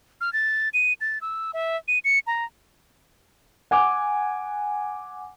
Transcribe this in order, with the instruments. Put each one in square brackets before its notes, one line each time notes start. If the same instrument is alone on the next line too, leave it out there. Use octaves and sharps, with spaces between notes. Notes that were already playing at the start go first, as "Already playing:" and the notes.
[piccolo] F6
A6
D#7
A6
E6
E5
D#7
C#7
A#5
[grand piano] F#5 G#5 D6